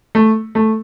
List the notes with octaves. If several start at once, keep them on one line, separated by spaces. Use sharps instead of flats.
A3
A3